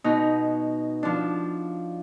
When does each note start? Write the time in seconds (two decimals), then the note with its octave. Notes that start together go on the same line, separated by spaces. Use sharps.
0.04 B2 D#4
1.03 F3 D4